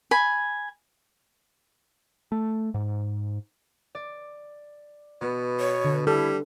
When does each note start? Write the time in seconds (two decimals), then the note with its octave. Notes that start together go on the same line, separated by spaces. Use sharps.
0.11 G#5 B5
2.32 A3
2.74 G#2
3.95 D5
5.21 B2 B3
5.60 C#5
5.84 D3
6.07 G3 E4 A4